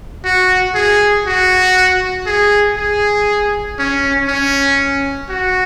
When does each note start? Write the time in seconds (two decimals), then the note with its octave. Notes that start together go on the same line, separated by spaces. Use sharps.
0.24 F#4
0.75 G#4
1.26 F#4
2.26 G#4
2.77 G#4
3.79 C#4
4.28 C#4
5.29 F#4